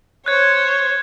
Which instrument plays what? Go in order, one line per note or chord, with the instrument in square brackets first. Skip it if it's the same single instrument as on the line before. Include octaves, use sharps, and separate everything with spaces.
[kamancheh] C5 C#5 [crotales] F#6 G#6